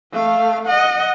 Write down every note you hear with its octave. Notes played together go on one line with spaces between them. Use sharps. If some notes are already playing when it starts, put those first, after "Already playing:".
A3 F5
D#5 F#5